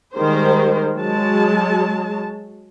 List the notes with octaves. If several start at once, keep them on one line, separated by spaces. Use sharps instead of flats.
D#3 G3 G#3 C5
F#3 G#3 A5